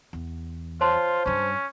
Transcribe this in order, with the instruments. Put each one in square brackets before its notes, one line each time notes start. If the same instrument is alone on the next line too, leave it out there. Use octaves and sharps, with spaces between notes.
[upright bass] E2
[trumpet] F4 [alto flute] C5 [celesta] C#5 A5 C6
[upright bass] G2 G3 [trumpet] C#4